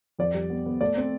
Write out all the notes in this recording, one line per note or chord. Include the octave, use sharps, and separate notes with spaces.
F2 D5
G3
B3
B3
A3 D5
C4